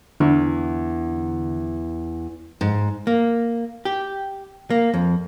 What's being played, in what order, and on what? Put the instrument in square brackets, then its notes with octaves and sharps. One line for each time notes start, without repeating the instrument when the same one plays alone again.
[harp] E2 [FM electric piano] D3
[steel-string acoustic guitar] G#2
[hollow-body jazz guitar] A#3
G4
A#3
F2